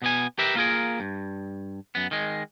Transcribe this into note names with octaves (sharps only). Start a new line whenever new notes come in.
B2 B3 G#5
G4 A#4 B4 E5
A#3 F4 G#4 A#4
G2
F#2 B3
D#3 G#3